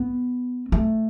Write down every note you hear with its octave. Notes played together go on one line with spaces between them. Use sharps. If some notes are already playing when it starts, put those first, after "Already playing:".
Already playing: B3
A3